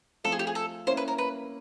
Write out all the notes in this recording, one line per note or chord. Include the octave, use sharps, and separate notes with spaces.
F3 A3 C4 F4 A4
G#4
G4
G#4
A4
A#3 C#4 E4 C5
B4
A#4
B4